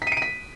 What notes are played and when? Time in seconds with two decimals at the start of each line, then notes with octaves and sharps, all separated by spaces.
0.02 B6
0.07 D#7
0.12 D7
0.17 D#7
0.22 B6